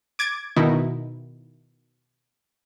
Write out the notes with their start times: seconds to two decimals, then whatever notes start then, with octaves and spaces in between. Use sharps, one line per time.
0.19 D6 G#6 A6 D7
0.56 B2 D#3 D#4 E4